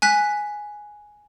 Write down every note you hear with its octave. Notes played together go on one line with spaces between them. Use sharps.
G#5 F#6 B6